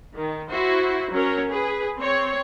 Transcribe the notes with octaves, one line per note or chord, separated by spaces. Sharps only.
D#3
E4 F#4 C5
F#3 C#4 A#4 C#5
G#4 B4
C4 C#5